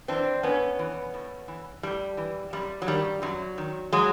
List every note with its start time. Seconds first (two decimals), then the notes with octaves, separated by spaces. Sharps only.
0.08 E3 C4 D4
0.43 A2 B3 C#4
0.79 E3
1.14 A2
1.48 E3
1.83 A2 G3
2.17 E3
2.53 F#2 G3
2.82 F#3
2.87 D#3 G3
3.22 F#2 F#3
3.58 D#3
3.92 F#3 G#3